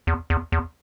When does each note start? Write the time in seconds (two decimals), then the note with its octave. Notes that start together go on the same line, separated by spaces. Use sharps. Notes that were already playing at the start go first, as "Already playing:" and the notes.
0.07 E2
0.30 E2
0.52 E2